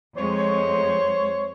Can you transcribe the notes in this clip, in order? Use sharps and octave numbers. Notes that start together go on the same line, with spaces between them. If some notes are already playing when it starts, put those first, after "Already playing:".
F2 G#3 C5 C#5